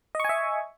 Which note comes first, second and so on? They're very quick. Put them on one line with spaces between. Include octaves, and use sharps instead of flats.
D#5 C#6 G#5 E5